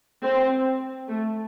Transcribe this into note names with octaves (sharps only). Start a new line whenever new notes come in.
C4
A3